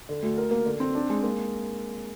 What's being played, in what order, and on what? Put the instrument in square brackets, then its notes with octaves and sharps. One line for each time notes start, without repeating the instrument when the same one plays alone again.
[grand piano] D3
D2
A#4
A#3
D3
C4
D4
G#3
A#3